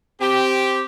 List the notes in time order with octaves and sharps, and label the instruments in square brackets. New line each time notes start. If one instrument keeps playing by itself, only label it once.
[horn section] C4 G4